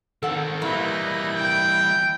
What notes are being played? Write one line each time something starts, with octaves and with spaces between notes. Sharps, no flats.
D#3 C4 A4 F#5
A#2 E3 G3 A#3 B3 D#4 E4
G5